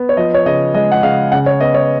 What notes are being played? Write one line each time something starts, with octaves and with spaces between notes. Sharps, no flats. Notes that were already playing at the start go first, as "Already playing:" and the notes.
Already playing: B3
C#5
F3 D#5
C#5
C#3 D#5
G#3 D#5
F#5
C#3 F5
C#3 F#5
C#5
B3 D#5
C#5